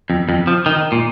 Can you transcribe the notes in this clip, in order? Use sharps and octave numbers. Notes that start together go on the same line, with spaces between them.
F2
F2
F3
D#3
A#2